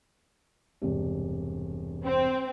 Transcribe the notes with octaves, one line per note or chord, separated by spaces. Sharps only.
E1 G2 C3
C4